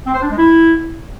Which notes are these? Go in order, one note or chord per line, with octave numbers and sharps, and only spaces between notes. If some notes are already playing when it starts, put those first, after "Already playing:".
C4
C5
D4
G#3
E4